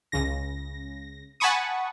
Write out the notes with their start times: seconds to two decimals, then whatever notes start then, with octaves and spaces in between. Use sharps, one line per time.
0.12 C#2 C#3 A#6
1.40 F#5 G#5 A5 B5 C#6 D#6